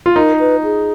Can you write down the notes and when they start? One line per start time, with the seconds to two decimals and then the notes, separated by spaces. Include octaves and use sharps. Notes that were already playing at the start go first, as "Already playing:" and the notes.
0.06 F4
0.16 D#4 A#4
0.40 B4
0.64 G#4